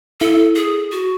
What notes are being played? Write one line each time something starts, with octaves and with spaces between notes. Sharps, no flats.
E4 A4
G#4
F#4